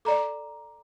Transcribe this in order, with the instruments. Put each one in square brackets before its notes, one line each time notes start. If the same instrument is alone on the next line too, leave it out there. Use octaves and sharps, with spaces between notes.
[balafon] A4 D5 [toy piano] A#5 D6